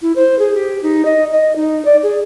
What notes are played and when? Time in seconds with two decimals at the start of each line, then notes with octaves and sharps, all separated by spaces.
0.02 E4
0.16 C5
0.39 G#4
0.54 G4
0.83 D#4
1.05 D#5
1.32 D#5
1.56 D#4
1.85 D5
2.03 G#4